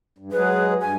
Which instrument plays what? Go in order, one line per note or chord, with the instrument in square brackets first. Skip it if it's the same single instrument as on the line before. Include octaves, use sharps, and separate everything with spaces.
[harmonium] G2
[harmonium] F#3 G#3 G#4 [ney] B4
[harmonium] G2 [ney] G#5